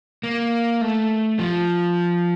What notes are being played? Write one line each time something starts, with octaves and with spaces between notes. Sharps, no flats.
A#3
A3
F3